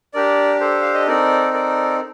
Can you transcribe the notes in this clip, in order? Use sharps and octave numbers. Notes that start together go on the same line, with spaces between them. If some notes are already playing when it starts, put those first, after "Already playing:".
D4 G4 A#4 D5
A4 C5
F5
D#5
C4 D#4 A4 A#4 D5
A#4 D5